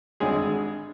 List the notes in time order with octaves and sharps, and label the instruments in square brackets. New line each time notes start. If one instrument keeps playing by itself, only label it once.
[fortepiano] G#1 D3 G3 G#3 G#4